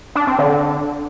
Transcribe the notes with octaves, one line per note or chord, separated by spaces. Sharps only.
D4
C4
D3